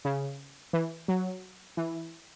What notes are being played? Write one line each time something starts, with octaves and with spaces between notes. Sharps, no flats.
C#3
E3
F#3
E3